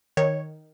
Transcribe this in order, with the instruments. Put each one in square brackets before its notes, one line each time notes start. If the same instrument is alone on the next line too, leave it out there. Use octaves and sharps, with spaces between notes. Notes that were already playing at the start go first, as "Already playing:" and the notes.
[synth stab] D#3 C#5